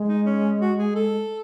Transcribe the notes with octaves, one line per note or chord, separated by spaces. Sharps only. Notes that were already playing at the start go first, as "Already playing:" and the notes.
Already playing: G#3
D#4
C#4
F#4
G#4
A4